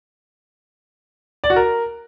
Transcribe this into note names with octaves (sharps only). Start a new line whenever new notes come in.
D5
F#4
A#4